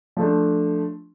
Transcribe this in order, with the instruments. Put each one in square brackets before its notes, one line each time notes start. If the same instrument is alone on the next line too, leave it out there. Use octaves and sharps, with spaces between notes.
[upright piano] F3 A3 D4